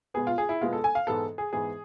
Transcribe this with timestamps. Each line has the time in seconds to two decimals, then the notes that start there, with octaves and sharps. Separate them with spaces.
0.14 B2 G#3 B3 G#4
0.27 F4
0.38 G#4
0.49 E4
0.61 B2 G#3 B3 F4
0.73 A4
0.84 G#5
0.95 F5
1.07 G#2 E3 G#3 B3 A4
1.38 G#4
1.53 G#2 E3 G#3 B3 G#4